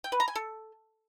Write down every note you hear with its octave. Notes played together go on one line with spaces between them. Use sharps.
G5
B4
A#5
G#5
A4